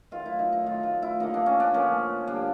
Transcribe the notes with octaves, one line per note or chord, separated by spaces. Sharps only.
D#3 F#3 A3 F4
E4
D#4
D#4
D#3 F#3 A3 F4
F4
E4
D3 F3 A#3 D#4
D4
C#4
D4
D3 F3 A#3 C#4
D3 G3 A#3 D4